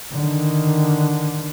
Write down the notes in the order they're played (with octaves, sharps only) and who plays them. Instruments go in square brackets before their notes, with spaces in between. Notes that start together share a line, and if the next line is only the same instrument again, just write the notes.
[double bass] D3 D#3